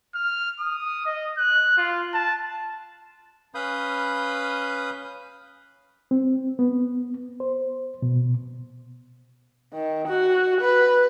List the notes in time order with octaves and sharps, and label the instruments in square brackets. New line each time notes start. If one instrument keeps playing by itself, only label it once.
[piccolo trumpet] F6
D#6
D#5
F#6
F4
A5
[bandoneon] C#4 B4 F5 B5 D#6 G6
[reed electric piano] C4
B3
C5
B2
[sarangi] D#3
F#4
B4